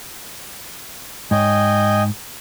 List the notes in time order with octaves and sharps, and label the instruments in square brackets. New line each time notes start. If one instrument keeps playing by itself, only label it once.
[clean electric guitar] G#2 C#5 [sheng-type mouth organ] D#5 G5 G#5